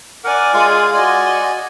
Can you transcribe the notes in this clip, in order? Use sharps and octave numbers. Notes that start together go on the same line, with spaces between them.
A#4 D5 F#5 G#5
G#3 F4
F#4 D5 D#5 G#5